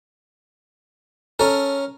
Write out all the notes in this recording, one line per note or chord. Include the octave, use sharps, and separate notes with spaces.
C#4 A4 A#4